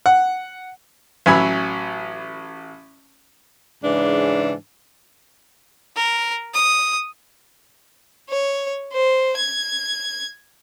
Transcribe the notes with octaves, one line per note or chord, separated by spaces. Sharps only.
F#5
A1 F#3 G#5 B5 E6
G#2 C#3 E3 D4
A#4
D#6
C#5
C5
G#6